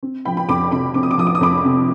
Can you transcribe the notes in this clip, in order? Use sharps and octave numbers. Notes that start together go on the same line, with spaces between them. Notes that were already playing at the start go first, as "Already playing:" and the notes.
C4
F3 G5 B5
G5 B5
F2 B5 D6
C3 B5 D6
C4 D6
D#6
D6
F3 D#6
D6
D#6
F2 B5 D6
C3